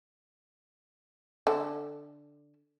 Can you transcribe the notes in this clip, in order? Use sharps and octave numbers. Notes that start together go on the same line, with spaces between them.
D3 A4